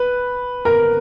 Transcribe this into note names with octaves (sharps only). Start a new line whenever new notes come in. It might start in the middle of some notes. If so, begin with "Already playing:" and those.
Already playing: B4
A#4